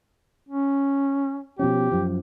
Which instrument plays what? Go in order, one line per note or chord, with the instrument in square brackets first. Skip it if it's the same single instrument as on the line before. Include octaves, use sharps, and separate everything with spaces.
[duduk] C#4
[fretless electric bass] B2 F3 C#4 [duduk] G4
[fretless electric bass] F#2 F3